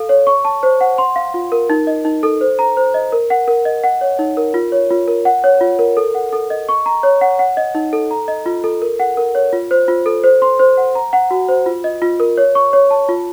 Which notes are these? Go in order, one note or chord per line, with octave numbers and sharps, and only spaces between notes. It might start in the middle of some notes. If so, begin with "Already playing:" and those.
Already playing: A4 F5
C#5
C#6
A5
C5
F#5
C6
F5
F4
A#4
D#4
D#5
D#4
A4
C5
A#5
C5
D#5
A#4
F#5
A#4
D#5
F#5
C#5
D#4
A#4
F4
C#5
F4
A#4
F#5
C#5
F4
A#4
A4
F#5
A4
D#5
C#6
A#5
C#5
F#5
F#5
D#5
D#4
A4
A#5
D#5
F4
A4
A#4
F#5
A#4
C#5
F4
C5
F4
A4
C5
C6
C5
F#5
A#5
F#5
F#4
C5
F4
D#5
F4
A#4
C#5
C#6
C#5
A5
F4